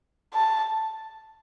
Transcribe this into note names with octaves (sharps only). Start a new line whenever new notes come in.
A5